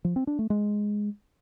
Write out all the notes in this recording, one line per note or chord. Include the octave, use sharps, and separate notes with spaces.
F3
C4
D4
A3
G#3